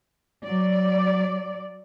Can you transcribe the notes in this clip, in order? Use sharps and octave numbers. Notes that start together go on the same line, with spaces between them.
F#3 D5